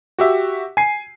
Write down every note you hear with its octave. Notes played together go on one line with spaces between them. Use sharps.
F#4 G4 E5
G#5 C7